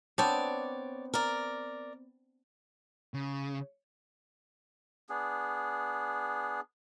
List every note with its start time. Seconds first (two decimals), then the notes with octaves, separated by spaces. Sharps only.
0.18 B3 C4 D4 C#5 D5
1.14 A#4 D5
3.14 C#3
5.10 B3 D4 G#4